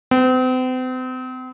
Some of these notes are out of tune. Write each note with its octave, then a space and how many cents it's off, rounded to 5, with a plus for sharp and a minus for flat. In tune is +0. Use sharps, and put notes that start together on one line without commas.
C4 -40